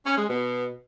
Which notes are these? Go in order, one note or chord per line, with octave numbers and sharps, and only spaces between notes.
C#4
G#3
B2